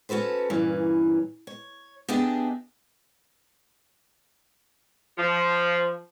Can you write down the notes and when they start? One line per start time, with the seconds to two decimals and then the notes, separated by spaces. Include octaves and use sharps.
0.09 C#4 F#4 A4 B4 C5
0.50 G2 A#2 E3 C#4
1.47 C#5
2.08 B3 D4 G4 G#4 D#5 E5
5.18 F3